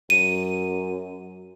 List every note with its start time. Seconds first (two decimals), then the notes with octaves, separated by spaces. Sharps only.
0.10 F#2 D#7